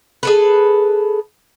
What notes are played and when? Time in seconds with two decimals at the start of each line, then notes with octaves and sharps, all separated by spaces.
0.23 G#4 A4 B4